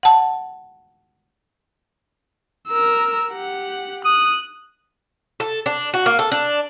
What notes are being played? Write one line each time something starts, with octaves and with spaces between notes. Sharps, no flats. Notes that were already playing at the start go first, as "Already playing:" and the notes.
F#5 A5
A#4 E6
G4 F#5
D#6 F#6
A4
D4
F#4
A#3
A4
D4